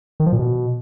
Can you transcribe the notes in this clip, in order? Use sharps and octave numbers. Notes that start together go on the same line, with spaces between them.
D#3
F3
A#2
B2